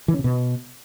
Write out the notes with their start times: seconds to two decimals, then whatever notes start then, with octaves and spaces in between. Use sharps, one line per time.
0.08 E3
0.14 C#4
0.19 C3
0.24 B2